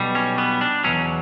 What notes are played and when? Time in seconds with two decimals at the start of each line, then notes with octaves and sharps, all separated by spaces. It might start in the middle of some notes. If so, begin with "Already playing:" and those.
Already playing: B1 B2 G3
0.15 C#4
0.38 B3
0.61 D4
0.84 E2 B2 F#3 C#4